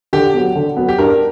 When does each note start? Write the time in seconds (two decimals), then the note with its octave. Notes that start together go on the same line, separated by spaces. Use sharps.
0.13 D3 G4
0.34 F#3 B3
0.55 D3
0.77 F#3 B3
0.89 G4
0.98 G2 A#4